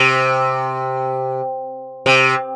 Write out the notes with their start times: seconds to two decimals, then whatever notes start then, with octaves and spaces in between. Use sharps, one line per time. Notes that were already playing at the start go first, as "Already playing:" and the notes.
Already playing: C3
2.06 C3